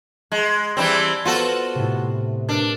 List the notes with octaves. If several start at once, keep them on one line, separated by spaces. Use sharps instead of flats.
G#3 A#5
E3 G3 C4 D5 A5 B5
B3 F4 F#4 A4 C5
A2 C3
D4 A#4 F6 C#7